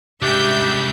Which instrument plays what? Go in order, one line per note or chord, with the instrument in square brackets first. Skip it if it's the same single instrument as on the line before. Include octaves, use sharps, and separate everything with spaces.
[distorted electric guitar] C2 C#3 [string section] G#2 E5 G6 [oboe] D4 [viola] G4